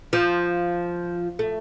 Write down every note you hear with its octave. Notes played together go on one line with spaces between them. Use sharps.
F3
A3